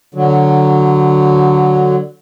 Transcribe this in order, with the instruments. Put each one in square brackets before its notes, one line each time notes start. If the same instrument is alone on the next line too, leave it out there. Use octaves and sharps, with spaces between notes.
[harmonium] D3 F#3